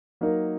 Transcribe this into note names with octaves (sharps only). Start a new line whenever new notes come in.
F#3 A#3 D#4 A#4